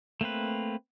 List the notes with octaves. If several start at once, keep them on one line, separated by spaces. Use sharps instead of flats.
A3 A#3 C4 B4